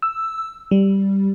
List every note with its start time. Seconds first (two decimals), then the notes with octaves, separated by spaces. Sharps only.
0.02 E6
0.71 G3